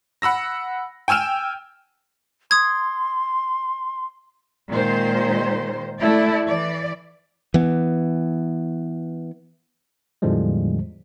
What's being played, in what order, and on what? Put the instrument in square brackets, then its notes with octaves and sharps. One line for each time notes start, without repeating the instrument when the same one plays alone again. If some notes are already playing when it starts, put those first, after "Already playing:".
[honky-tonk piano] F#5 B5 E6 A#6
G5 G#5 E6 F6 E7
[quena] C6 [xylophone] D#6 G#6
[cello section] A#2 D#3 G#3 C5
A3 E4 D5
E3 D5
[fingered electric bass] E3 B3
[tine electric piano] E2 A2 D3 F3 G3 G#3